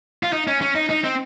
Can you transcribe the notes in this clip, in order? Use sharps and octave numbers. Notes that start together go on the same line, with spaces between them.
F4
D#4
C#4
C#4
D#4
D#4
C4